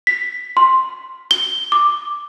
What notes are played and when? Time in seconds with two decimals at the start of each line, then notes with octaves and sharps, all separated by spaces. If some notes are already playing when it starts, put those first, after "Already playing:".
0.07 B6
0.57 C6
1.31 G7
1.72 D6